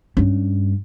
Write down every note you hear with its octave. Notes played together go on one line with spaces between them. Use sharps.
G2 C#4